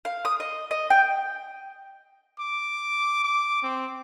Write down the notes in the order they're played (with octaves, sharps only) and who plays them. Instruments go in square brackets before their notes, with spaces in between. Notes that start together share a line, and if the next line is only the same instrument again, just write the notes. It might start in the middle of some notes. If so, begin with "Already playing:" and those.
[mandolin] F5
D#6
D#5
D#5
G5
[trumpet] D6
D6
C4